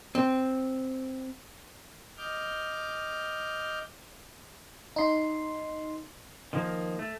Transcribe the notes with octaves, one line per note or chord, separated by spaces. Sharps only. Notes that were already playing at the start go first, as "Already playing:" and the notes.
C4
D#5 D6 F6 G6
D#4 C6
D#3 F3 A#3
A3